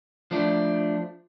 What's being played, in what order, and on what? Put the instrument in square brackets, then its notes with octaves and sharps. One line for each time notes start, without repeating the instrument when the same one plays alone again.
[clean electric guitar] F3 A3 D4